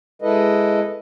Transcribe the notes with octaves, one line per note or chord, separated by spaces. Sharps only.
G#3 E4 A4 B4 D#5